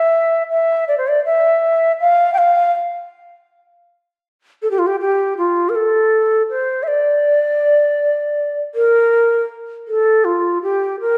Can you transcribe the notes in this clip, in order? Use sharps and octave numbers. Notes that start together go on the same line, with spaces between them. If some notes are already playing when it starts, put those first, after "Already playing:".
Already playing: E5
E5
D5
C5
D5
E5
F5
G5
F5
A4
G4
F4
G4
G4
F4
A#4
A4
C5
E5
D5
A#4
A4
F4
G4
A#4